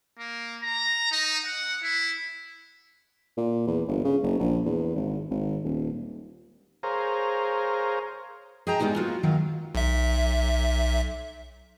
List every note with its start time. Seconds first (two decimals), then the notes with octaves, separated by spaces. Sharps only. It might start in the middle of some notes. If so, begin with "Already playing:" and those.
0.19 A#3
0.63 A#5
1.11 D#4
1.46 F#5
1.82 E4
3.37 A#2
3.67 E2
3.88 G1
4.05 C#3
4.23 F#1
4.39 A#1
4.65 E2
4.96 G#1
5.31 G#1
5.64 D#1
6.83 G#4 A#4 C5 C#5 F5 A#5
8.67 G#4 D#5 G5 A5 A#5
8.80 G3 G#3 B3 D#4 G4
8.96 F#3 A#3 B3 F4 F#4
9.23 D#3 F#3 F5
9.75 B1 E5